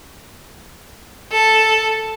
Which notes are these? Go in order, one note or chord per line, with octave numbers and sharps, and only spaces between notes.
A4